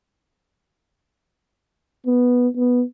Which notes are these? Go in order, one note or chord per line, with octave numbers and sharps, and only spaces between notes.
B3
B3